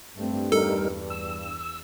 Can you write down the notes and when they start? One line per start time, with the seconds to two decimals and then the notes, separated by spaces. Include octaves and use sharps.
0.17 G2 A3 C4
0.52 E2 G3 D#4 A4 A#4
1.10 E6